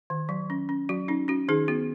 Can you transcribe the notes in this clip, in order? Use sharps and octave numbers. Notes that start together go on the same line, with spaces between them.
D#3
F#3
C#4
C#4
F#3 F#4
C#4 D#4
C#4 F#4
D#3 D#4 G#4
B3 F#4